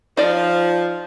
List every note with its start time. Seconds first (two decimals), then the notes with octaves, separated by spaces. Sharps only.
0.17 F3 D#4 D5